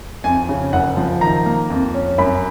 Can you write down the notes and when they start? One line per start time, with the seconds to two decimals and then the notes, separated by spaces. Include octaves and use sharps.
0.24 F2 G#5
0.49 C#3
0.73 F#1 F#5
0.97 F3
1.21 D#3 A#5
1.46 A#3
1.70 F2
1.94 C#4
2.18 F#2 B5